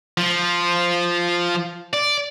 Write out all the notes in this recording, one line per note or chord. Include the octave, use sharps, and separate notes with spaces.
F3
D5